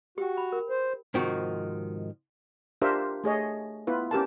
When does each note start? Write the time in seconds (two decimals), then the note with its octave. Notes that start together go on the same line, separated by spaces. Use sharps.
0.18 F#4 G4 G5
0.37 B5
0.52 A#4
0.70 C5
1.14 G#2 C3 D#3 F3 F#4
2.82 D4 F4 G4 A#4 C5 E5
3.24 A3 G#4 C#5 D#5
3.87 B3 E4 F4 B4
4.11 C#4 G4 A#4 A5